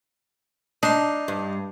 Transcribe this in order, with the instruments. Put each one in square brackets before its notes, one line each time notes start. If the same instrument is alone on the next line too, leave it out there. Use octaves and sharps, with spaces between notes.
[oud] D4 [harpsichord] D#4 C6
[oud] G2